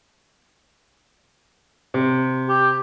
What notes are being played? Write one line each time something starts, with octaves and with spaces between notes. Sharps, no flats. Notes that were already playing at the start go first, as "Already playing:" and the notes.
C3
G4